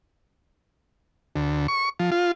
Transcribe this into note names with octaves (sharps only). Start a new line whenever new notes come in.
D2
C#6
F3
F4